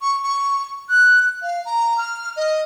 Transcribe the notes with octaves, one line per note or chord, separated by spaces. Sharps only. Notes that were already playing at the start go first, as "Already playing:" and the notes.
C#6
C#6
F#6
F5
A#5
F6
D#5